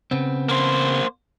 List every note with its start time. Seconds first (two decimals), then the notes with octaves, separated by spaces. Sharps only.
0.11 C#3 B3 C4
0.49 A#3 C5